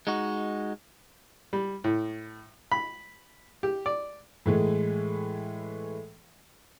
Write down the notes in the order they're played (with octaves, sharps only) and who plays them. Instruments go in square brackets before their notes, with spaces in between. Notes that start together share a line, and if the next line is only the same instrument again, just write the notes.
[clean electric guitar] G#3 D#4 F#4
[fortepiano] G3
A2
B5
G4
D5
[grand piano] A2 E3 G#3 A3